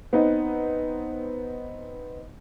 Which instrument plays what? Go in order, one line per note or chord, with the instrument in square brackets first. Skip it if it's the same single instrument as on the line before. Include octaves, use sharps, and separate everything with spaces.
[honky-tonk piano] B3 C4 D#4